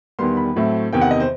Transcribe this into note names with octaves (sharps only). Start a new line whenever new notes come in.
E2 D#3 G3 B3 C6
B5
A2 F#3 A3 C4
E2 C3 D#3 G5
F#5
D#5
C5